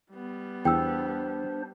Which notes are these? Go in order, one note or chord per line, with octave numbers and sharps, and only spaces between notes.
G3 B3
E2 D4 C5 G5 E6